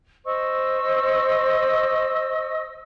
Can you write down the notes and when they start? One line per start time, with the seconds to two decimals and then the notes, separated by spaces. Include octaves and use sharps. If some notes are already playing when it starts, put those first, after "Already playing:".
0.24 C5 D#5 C#6 E6